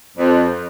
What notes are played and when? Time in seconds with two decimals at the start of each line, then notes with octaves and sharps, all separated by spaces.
0.17 F2